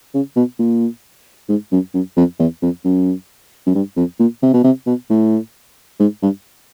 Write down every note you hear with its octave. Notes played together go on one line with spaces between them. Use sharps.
C#3
B2
A#2
G#2
F#2
F#2
F2
E2
F2
F#2
F#2
G2
F2
A#2
C3
B2
C3
B2
A2
G#2
G2